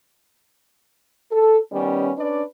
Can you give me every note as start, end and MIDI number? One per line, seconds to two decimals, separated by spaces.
1.31 1.58 69
1.72 2.11 51
1.72 2.11 55
1.72 2.11 59
1.72 2.11 61
2.17 2.41 61
2.17 2.41 62
2.17 2.41 71
2.17 2.41 74